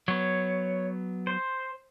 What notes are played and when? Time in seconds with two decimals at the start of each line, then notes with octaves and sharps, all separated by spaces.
0.08 F#3 B3 C#5
1.27 C5